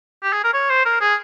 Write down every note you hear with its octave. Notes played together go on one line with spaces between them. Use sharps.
G4
G#4
A#4
C#5
C5
A#4
G#4